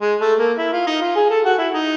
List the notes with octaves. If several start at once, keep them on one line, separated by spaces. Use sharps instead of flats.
G#3
A3
A#3
E4
F4
D#4
F4
G#4
A4
F#4
E4
D#4